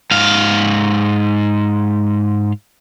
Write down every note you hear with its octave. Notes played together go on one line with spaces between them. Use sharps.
G#2 F5